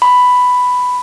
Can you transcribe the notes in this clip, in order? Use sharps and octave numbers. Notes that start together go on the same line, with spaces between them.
B5